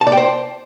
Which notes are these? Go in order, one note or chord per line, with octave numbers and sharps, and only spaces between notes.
A5
D5
G5
C5